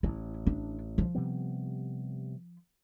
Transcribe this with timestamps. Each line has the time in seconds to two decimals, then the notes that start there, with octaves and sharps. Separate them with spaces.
0.03 A1 E4
0.47 D4
0.98 F3
1.15 C3 G3 B3